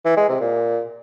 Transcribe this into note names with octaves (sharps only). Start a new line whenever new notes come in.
E3
G#3
C3
A#2